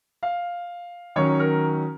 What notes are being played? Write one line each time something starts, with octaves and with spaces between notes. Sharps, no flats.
F5
D#3 F#3 C#4 C#5
A#4